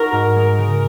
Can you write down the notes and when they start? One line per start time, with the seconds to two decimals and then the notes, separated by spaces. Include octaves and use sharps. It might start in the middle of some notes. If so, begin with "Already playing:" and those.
Already playing: D#4 F#4 A#4
0.12 G#2
0.36 G#3
0.58 C#3